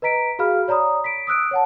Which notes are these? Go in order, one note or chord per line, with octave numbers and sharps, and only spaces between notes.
B4 D#5 A#5 B6 D7
F#4 G#4 F5 B5 F6
C#5 D5 A#5 B5 D#6
B6 D7
D#6 E6 F#6 D7
C#5 F#5 A5